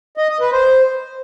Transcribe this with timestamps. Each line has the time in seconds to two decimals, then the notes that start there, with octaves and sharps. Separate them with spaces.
0.17 D#5
0.29 D#5
0.41 B4
0.52 C5